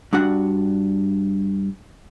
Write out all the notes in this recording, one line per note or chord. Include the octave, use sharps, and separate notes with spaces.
G2 D4 F#4 F#5